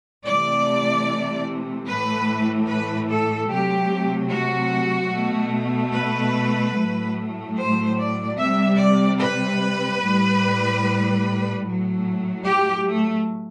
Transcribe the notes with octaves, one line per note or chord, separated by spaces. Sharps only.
C3 E3 A3 D5
A2 E3 A3 B4
B4
A4
C3 F#3 A3 G4
F#4
B2 A3
B4
A2 F#3 A3
C5
D5
C3 G3 E5
D5
B4
A2 G3
A2 F#3 A3
G4
A3